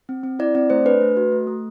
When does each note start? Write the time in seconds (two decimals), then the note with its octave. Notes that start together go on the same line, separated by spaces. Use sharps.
0.09 C4
0.24 C4
0.39 E4 D5
0.55 C4 D5
0.70 A3 C5
0.85 D4 B4
1.01 A3
1.17 F#4
1.32 A3
1.47 A3